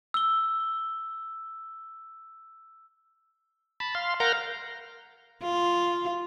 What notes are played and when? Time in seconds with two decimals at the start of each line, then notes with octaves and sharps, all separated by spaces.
0.14 E6 G7
3.80 A5 B5
3.95 F5 C6
4.20 A#4 F5 F#5 A#5 F6 G6
5.43 F4